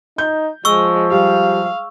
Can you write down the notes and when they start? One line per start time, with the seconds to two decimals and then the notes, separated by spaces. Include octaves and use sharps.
0.18 D#4 G6
0.65 F3 G#3 C#6 E6
1.11 G3 F5